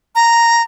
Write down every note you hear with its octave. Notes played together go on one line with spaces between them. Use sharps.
A#5